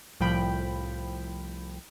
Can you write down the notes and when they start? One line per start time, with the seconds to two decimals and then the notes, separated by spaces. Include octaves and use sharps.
0.20 C2 A2 F3 G5 B5